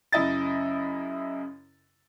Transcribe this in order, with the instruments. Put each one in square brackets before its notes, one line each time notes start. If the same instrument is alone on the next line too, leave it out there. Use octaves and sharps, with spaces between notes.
[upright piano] F#2 C#3 E4 D#5 A6